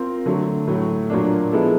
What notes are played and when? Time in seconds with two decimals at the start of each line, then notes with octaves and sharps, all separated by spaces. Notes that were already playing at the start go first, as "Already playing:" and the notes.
Already playing: C4 F4 A#4
0.26 D3 F#3 A3
0.67 A2 F#3 A3
1.10 A#2 F#3 A#3 D4
1.52 F3 G#3 B3 E4 A4